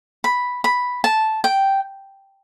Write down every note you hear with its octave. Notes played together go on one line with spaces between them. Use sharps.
B5
B5
A5
G5